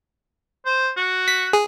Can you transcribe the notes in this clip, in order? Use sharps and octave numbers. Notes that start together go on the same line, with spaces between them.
C5
F#4
B6
G#4